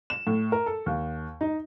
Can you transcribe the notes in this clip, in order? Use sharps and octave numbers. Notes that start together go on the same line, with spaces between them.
E7
A2
A#4
A4
D#2
D#4